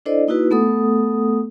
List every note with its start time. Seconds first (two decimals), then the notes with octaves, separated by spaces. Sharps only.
0.06 D4 E4 A4 C5 D5 D#5
0.28 A#3 D#4 E4 F#4 B4
0.51 A3 B3 A4 F#5 D#6